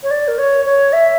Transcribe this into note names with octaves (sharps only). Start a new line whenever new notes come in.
C#5
D5
A#4
C#5
C#5
E5